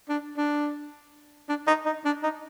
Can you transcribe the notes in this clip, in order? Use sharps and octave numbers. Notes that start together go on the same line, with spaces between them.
D4
D4
D4
D#4
D#4
D4
D#4